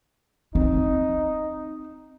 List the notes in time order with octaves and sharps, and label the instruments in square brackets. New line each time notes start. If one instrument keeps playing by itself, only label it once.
[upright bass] C4 [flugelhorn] D#4